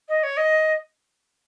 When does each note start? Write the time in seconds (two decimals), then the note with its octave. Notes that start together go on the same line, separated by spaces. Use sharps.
0.09 D#5
0.23 C#5
0.37 D#5